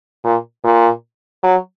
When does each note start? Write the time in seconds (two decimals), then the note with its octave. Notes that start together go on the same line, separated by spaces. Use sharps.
0.24 A#2
0.64 A#2
1.43 F#3